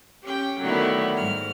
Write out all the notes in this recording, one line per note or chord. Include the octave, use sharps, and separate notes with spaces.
C#4 G4 G5
D3 D#3 F#3 A3 B3 E4
G#2 F6